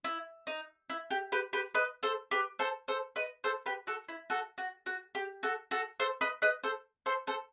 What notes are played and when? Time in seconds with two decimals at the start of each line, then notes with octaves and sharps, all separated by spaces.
0.04 E4
0.47 D#4
0.90 E4
1.10 G4
1.32 G4 B4
1.53 G4 B4
1.75 B4 D#5
2.03 A4 C5
2.31 G4 B4
2.59 A4 C5
2.88 A4 C5
3.16 B4 D#5
3.44 A4 C5
3.66 G4 B4
3.87 F#4 A4
4.09 E4
4.30 F#4 A4
4.58 F#4
4.86 F#4
5.15 G4
5.43 F#4 A4
5.71 F#4 A4
6.00 A4 C5
6.21 B4 D#5
6.42 B4 D#5
6.63 A4 C5
7.06 A4 C5
7.27 A4 C5